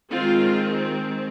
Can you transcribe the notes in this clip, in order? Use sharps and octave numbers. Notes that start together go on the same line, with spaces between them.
D#3 G#3 C4 F4